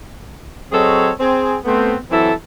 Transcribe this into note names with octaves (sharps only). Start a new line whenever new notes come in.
F#3 C4 G#4 A4 C#5 D#5
C4 G#4
A3 B3 C4
E3 F#3 C4 E4 A4